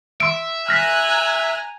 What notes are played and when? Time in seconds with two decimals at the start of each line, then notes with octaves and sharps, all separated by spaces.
0.20 E5 C6 E6 D7
0.68 G#5 A#5 F6 F#6 A#6 B6